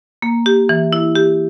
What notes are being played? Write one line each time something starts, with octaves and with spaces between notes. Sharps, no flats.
A#3
G4
E3
E4
G4